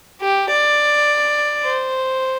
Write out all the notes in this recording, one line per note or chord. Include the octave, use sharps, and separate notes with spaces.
G4
D5
C5